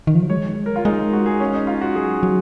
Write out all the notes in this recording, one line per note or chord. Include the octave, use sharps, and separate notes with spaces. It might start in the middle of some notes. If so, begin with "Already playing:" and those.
D#3
F3
F#3
G#3 C#5
A#4
F4
G#3 D#4
F4
F#4
G#4
C#4
D#4
F4
F#4
F#3 G#4
F#3